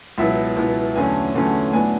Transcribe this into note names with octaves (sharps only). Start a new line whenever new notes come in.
C#2 B2 F#3 B3 E4 E5
C#2 B2 F#3 B3 E4
E2 D3 F#3 A3 C#4 G#5
E2 D3 F#3 A3 C#4
A2 F#3 B3 D4 G#5